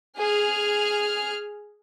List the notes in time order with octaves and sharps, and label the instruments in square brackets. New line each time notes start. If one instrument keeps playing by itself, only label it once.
[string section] G#4 F6